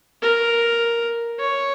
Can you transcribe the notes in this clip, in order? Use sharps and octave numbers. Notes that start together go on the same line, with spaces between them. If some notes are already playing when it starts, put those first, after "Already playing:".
A#4
C#5